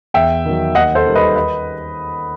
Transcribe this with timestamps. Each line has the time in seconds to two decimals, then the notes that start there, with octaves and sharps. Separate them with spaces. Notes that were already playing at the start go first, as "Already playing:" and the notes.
0.14 E2 E5 G5
0.45 D#3 F#3
0.75 D#2 D#5 F#5
0.95 A4 C5
1.06 D#3 G3
1.16 B4 D#5
1.36 B4 D#5